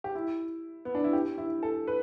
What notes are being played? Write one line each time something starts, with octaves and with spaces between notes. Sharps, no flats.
G4
E4
B3
D4
E4
G4
E4
A4
B4